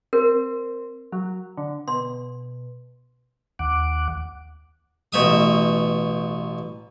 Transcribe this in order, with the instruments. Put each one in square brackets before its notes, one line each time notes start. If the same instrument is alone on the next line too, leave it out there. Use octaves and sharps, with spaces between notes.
[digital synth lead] C4 [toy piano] A#4
[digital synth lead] F#3
D3
[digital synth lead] B2 [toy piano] C6
[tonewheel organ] D#2 F#5 D6
[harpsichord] A1 B2 E5 D#6